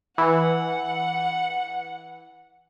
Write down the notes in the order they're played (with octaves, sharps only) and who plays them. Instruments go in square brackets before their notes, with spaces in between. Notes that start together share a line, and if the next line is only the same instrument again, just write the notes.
[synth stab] E3 [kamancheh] F#5